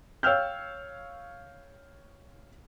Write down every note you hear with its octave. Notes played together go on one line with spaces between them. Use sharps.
C#5 F5 G5 E6 F6 G6